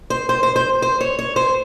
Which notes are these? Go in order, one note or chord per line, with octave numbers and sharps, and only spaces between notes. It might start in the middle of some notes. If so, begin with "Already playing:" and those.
C5
C5
C5
C5
C5
C#5
C#5
C5